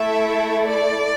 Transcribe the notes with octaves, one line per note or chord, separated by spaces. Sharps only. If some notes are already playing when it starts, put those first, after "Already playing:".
Already playing: A3 E4 A4 E5
D5